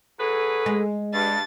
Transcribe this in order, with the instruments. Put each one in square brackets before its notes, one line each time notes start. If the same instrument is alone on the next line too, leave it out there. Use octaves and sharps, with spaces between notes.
[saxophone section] F#3 G#4 B4 [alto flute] A4
[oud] G#3
[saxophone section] G2 [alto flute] A5 [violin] A6